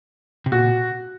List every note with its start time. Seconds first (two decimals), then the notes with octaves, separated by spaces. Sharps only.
0.46 C3
0.51 A#2 F#4